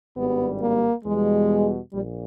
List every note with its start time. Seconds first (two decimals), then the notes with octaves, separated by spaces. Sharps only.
0.16 G#1 G2 G3 B3
0.61 A#3
1.05 E2 B2 G3 G#3
1.94 A#1 A#2 G3